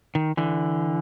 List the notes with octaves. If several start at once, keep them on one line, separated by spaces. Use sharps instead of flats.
D#3
D3 E3